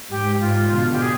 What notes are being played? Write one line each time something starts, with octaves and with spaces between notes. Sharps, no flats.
G#2 G4
G#2 F4
B2 D3
G4
G#4